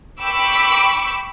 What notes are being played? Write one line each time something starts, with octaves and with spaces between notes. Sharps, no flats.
G5 B5 C#6 D6 E6